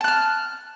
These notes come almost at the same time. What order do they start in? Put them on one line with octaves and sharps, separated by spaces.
A5 F#6 F6